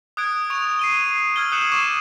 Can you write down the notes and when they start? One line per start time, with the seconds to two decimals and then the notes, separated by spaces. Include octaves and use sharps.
0.17 D#6 F#6 G#6 D7
0.50 C#6 F7
0.79 C7 D#7 G7
1.36 E6 F6 G#6 G7
1.52 D#6 F#6 G6 C#7 E7 F#7
1.72 C#6 D6 C7 E7